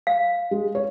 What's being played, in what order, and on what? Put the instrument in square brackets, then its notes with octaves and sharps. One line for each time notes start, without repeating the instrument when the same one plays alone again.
[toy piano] F5
[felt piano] G#3
C#5